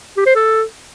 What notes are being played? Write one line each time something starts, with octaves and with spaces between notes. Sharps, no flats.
G4
C5
A4